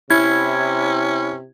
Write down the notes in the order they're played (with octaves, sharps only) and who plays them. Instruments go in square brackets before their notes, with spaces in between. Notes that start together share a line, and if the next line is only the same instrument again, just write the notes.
[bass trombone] C3 [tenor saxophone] C#4 [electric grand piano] E4 [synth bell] G#6